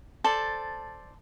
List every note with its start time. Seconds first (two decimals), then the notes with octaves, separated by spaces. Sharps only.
0.24 A4 C5 D5 A5